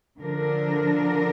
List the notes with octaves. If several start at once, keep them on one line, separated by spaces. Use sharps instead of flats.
D3 F3 D4 A#4